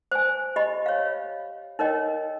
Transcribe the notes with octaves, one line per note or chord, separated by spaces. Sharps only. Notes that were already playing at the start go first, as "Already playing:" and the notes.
C5 G#5
G4 D#5 B5
C#5 F5
D#4 A#4 C#5 D#5 G5